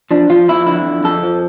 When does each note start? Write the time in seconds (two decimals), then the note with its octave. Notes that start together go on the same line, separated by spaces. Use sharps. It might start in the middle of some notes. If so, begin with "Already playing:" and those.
0.11 F3 D4
0.30 F3 F4
0.48 F2 E4
0.67 D3 E4
0.85 F2
1.04 F2 A4
1.23 F3